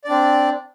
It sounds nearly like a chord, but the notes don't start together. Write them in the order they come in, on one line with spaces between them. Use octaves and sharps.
D5 D4 C4